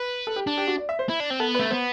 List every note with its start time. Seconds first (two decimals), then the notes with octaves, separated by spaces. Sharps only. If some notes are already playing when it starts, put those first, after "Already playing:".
Already playing: B4
0.27 A4
0.36 G4
0.47 D4
0.57 G4
0.68 F#4
0.77 D5
0.89 E5
0.99 C5
1.09 E4
1.20 D4
1.30 C4
1.40 B3 A4
1.55 B4
1.59 A3
1.70 B3 C5